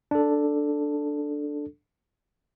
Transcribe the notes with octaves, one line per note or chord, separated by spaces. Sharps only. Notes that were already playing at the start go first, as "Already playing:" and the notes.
D4 A4